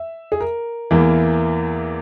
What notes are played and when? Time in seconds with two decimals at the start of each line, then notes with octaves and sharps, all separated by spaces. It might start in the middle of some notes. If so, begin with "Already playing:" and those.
Already playing: E5
0.32 G#4
0.40 A#4
0.91 E2 E3 A#3